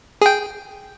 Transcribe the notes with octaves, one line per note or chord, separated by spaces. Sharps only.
G#4 G5